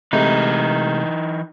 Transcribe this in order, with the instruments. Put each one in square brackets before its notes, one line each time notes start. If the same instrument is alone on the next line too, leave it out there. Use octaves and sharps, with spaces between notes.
[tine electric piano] C3 G#3 A3 [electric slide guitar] E3 D#4